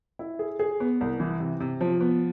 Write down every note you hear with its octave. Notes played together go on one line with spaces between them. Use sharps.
E4
G#4
G#4
B3
C2
E3
C3
C3
F3
B3